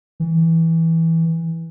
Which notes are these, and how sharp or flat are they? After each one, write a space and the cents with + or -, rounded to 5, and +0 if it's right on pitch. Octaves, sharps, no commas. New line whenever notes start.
E3 -10